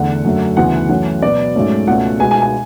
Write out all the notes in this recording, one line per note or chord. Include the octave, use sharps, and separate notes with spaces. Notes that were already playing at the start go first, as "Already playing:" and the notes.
Already playing: E2 D3 A3 F#5
F#2 D3 A3 C#4
D2 C#3 E3 B3 F#5
F#2 E3 A3 C#4 F#5
B2 F#3 B3 D5
G#2 F#3 A3 C#4
C#2 B2 A3 C#4 F#5
B2 G#3 B3 G#5
G#5
G#5